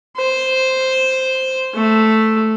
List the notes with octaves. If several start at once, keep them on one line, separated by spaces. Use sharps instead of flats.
C5
A3